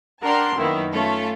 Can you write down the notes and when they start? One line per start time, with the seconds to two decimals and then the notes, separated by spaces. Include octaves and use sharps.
0.23 D4 A#4 F#5 G5 A5 C6
0.57 F#2 D#3 A#3 B3 E4
0.92 A3 C#4 F4 A4